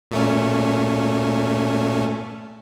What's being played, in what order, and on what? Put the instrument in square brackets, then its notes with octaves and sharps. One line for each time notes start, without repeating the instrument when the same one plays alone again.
[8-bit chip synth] A#2 A3 C#4